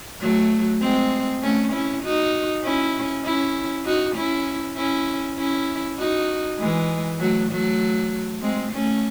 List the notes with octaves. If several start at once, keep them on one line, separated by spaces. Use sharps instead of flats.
F#3 A3
G#3 C4
A3 C#4
C#4 E4
D#4 F#4
C#4 E4
C#4 E4
D#4 F#4
C#4 E4
C#4 E4
C#4 E4
D#4 F#4
E3 G#3
F#3 A3
F#3 A3
G#3 C4
A3 C#4